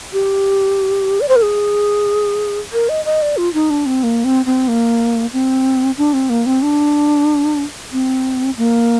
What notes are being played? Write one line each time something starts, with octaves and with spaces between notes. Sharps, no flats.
G4
D5
C5
A#4
G#4
A#4
D#5
D#5
D5
F4
D#4
D4
C4
A#3
C4
C4
A#3
C4
D4
C4
A#3
C4
D4
C4
A#3